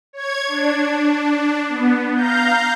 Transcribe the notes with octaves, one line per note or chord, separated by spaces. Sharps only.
C#5 G#6
D4
B3
F5 A#5 G6